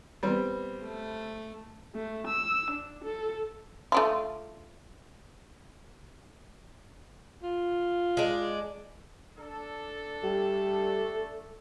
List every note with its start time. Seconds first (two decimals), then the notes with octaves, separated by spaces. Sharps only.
0.23 G3 B3 C4
0.83 A3
1.95 A3
2.27 E6
2.71 D4
3.04 A4
3.92 A3 D4 F4
7.43 F4
8.17 G#3 D4
9.38 D4 A4
10.23 G3 A3